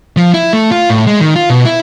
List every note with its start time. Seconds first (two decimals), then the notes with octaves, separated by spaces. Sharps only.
0.17 F3
0.34 E4
0.53 A3
0.71 F4
0.90 A2
1.07 G#3
1.21 D#3
1.36 F4
1.50 B2
1.65 E4